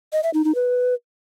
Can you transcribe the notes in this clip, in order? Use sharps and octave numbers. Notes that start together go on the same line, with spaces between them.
D#5
E5
D#4
D#4
B4